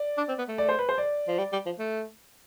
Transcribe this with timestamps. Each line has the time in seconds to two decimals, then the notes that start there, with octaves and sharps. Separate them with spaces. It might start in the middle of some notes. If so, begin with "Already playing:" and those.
Already playing: D5
0.17 D4
0.28 C4
0.38 B3
0.48 A3
0.58 D5
0.69 C5
0.79 B4
0.89 C5
0.98 D5
1.28 F3
1.38 G3
1.53 G3
1.66 F3
1.79 A3